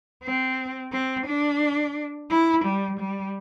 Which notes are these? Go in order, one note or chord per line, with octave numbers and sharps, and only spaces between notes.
C4
C4
D4
E4
G3
G3